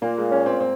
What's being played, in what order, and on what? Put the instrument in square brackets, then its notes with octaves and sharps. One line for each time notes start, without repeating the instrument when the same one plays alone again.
[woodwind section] A#2 [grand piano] A#3
[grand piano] G#3
[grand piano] G#3 [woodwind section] C#4
[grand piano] C4
C4